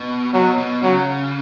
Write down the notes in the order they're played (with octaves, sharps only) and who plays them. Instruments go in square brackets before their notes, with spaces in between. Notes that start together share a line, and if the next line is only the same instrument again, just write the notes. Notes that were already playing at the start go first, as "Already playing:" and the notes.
Already playing: [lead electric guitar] B2
[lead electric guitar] B2 [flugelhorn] F#3
[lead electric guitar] B2
[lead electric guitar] C#3 [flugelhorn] F#3